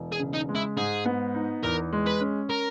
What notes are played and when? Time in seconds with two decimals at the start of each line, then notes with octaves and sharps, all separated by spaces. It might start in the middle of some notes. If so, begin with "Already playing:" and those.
Already playing: E1
0.12 G#4
0.19 C#3
0.34 D#4
0.49 G#3
0.55 E4
0.77 G#2 G#4
1.05 B3
1.35 D#4
1.63 E2 A#4
1.93 G#3
2.07 B4
2.20 C#4
2.50 A#4